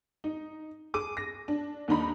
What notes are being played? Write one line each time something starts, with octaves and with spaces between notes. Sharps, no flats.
D#4
G#4 D6 D#7
A#6
D4
D#2 D#3 D4 D#4 A#5 B5